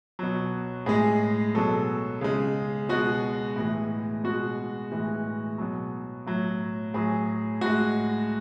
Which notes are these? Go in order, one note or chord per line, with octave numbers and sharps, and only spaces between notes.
B2 F#3
A2 G#3 G#4
B2 F#3 A4
C#3 G#3
B2 G#3 F#4
A2 E3 G#3
B2 G#3 F#4
A2 E3 G#3
B2 F#3
A2 F#3
A2 F#3 G#4
A2 G#3 F#4